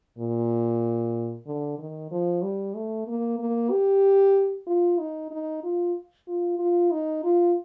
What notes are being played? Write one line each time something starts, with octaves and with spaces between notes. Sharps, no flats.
A#2
D3
D#3
F3
G3
A3
A#3
A#3
G4
F4
D#4
D#4
F4
F4
F4
D#4
F4